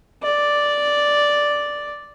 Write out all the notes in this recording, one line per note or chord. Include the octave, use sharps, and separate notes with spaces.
D5